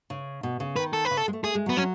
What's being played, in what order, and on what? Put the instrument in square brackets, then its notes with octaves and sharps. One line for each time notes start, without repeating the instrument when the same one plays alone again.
[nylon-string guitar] C#3
B2
C#3
[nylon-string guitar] D#3 [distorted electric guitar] B4
[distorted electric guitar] A4
B4
[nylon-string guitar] C#3
[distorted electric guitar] A4
[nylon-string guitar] G#3
A3
[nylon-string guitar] A3 [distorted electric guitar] G#4
[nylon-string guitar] G#3
F#3
[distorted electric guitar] B3
[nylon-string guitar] F#3 [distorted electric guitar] C#4